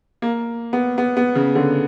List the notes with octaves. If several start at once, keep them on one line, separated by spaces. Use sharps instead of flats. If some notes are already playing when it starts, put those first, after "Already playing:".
A#3
B3
B3
B3
C#3
D3